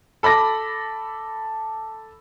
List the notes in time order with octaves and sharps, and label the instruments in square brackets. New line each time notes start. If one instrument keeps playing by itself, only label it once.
[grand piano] A4 B5 D6 A#6